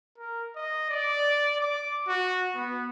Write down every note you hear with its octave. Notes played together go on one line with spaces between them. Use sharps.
A#4
D#5
D5
D6
F#4
B3